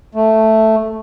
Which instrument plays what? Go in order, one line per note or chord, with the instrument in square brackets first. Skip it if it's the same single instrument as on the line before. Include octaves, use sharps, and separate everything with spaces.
[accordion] A3